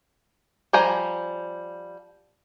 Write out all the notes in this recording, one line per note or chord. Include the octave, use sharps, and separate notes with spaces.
F3 G3 G5 G#5 A#5